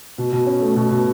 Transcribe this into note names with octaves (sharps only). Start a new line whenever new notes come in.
B2
B2
C#4
A3
B2
B2